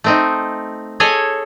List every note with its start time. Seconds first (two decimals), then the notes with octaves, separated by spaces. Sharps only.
0.04 A3 C4 D#4
1.00 G#4 A4 C#5 D#5 G#5